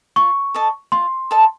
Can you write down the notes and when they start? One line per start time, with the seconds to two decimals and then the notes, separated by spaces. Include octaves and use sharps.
0.16 F4 C#6
0.54 A4 D#5 A5
0.92 F4 C6
1.31 A4 D#5 A5